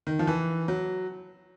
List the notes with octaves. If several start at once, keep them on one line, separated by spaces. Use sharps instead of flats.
D#3
F3
E3
F#3